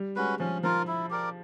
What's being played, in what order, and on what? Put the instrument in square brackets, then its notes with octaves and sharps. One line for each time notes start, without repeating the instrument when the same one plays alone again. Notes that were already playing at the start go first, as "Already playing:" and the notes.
Already playing: [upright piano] G3
[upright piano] G#3 [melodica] C#4 F#4 B4
[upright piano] F3 [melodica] C#4
[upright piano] F3 [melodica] F4 A#4
[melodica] E4
G4 A#4 D5